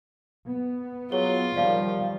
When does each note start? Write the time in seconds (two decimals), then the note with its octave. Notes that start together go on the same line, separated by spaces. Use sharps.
0.48 B3
1.12 F#3 F4 G#4 C#5 G7
1.56 D#3 F3 G3 D5 F5